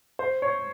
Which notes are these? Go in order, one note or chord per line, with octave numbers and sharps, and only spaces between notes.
C5
C#5